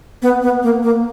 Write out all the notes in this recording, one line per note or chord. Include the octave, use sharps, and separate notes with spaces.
B3
B3
A#3
A#3